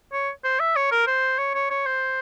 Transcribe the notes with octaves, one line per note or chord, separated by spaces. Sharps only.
C#5
C5
E5
C#5
A#4
C5
C#5
C#5
C#5
C5